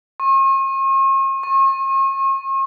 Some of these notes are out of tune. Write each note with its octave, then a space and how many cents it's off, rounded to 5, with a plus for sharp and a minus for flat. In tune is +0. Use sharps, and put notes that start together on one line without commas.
C#6 -45
C#6 -40